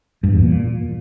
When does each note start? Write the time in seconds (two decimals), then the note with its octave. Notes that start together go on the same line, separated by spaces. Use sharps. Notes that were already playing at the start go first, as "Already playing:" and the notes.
0.24 G2
0.33 E2
0.42 A#2